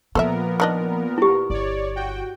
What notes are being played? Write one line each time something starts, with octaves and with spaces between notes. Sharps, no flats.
A#2 F3 B3 A4 A#4 C5 E5
D#3 D4 D#5
E4 G4
G1 C#5 D5
F#4 G5